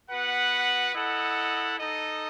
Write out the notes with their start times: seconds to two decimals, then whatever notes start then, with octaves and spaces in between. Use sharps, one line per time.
0.09 B3 F#4 B4 F#5
0.94 E4 A4 D#5 F#5
1.79 D#4 A4 D#5